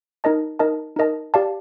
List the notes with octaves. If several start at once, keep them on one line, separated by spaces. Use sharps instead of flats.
D#4 A#4 D#5 A5
D#4 A#4 D#5 A5
D#4 A#4 D#5 A5
G4 D5 F5 A5